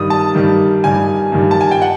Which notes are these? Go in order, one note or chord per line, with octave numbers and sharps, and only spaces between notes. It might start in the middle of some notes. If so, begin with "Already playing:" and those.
Already playing: G2 D#3 G3 D#6
A5
G2 D#3 G3
G2 D#3 G3 G#5
G2 D#3 G3
A5
G#5
G5
F#5